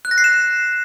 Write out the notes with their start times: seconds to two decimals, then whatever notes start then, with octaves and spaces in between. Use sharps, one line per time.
0.05 F#6
0.11 A#6
0.18 C7
0.24 E7